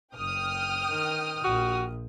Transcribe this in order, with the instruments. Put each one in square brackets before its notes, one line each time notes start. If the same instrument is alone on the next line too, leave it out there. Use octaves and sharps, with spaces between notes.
[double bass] F#1 [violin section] G5 D#6 F6
[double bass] D#3
[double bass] A#1 [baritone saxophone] F#4